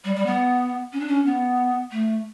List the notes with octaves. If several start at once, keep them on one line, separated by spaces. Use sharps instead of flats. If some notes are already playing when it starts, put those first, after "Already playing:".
G3
G3
B3
C#4
D4
C#4
B3
A3